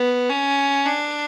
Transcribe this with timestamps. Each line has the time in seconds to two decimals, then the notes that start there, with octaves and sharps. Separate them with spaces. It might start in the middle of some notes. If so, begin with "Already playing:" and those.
Already playing: B3
0.29 C#4
0.85 D4